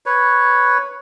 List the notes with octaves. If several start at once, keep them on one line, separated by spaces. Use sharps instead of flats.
B4 C#5